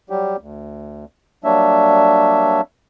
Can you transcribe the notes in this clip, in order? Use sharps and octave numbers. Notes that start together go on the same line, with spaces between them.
F#3 G3 G4
D2
F#3 G3 A#3 D4 C#5 E5